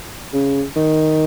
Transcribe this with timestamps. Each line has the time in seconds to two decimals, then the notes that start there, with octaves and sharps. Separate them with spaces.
0.33 C#3
0.76 D#3